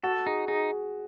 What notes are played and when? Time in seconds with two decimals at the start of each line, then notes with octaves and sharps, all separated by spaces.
0.03 F#4 A4
0.26 D#4 G#4
0.48 D#4 G#4